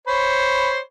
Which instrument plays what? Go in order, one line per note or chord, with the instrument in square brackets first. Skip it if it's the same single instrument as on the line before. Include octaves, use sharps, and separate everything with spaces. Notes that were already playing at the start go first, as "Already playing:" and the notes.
[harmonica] C5 C#5 B5